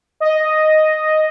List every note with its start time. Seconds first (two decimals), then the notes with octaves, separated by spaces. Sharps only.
0.20 D#5